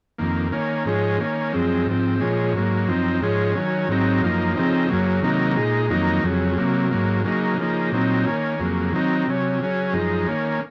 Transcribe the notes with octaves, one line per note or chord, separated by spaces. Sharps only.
F2 D#3 A#3
D#3 A#3 C#4
G#2 F3 G#3 C#4
D#3 A#3 C#4
F#2 F3 G#3 C4
G#2 F3 C4
A#2 F3 G#3 C#4
G#2 F#3 A#3
F#2 F3 C4 D#4
G#2 F3 G#3 C#4
D#3 F#3 C#4
G#2 F#3 C4 D#4
F#2 F3 A#3 D#4
C#3 F3 C4 D#4
F#2 C#3 F#3 A#3
C3 D#3 F#3 A#3 D#4
A#2 G#3 D#4
F2 D#3 F#3 A#3 D#4
F2 C#3 F#3
C3 F#3 A#3
G#2 F#3 A#3
C#3 F#3 A#3 D#4
C#3 F3 A#3 D#4
A#2 F#3 C4 D#4
D#3 A#3 C#4
F2 C#3 F#3 A#3
D#3 F#3 C4 D#4
C3 F#3 C#4
C#3 F#3 C#4
F#2 F3 G#3 D#4
D#3 A#3 C#4